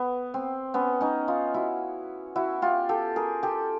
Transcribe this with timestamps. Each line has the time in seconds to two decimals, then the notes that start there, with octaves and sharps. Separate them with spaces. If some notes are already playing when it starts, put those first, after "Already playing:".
Already playing: B3
0.34 C4
0.74 B3 C#4
1.01 C#4 D#4
1.28 D#4 F4
1.54 E4 F#4
2.36 E4 F#4
2.62 F4 G4
2.89 G4 A4
3.16 G#4 A#4
3.43 G4 A4